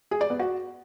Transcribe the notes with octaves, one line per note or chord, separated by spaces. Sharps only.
G#4
D5
B3
F#4